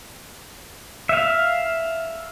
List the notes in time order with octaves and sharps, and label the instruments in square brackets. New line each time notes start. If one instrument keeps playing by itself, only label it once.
[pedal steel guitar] E5 F5